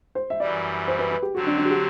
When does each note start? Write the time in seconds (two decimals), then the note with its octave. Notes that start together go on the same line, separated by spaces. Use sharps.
0.15 C5
0.30 E5
0.40 F#2 E3 G3 D5
0.88 C5
0.99 B4
1.11 B4
1.22 G4
1.35 D3 F#3 C4 F#4
1.47 D4
1.58 D4
1.65 F#4
1.71 G4